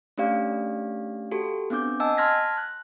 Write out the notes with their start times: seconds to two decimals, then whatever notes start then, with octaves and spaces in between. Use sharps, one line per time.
0.18 A3 C#4 D4 G4 D5 F5
1.32 F#4 G4 A4
1.70 B3 C4 D4 D6 G6
2.00 D#5 F#5 G#5 A5 E6
2.17 A5 C6 F6 G#6 A#6 B6
2.57 F#6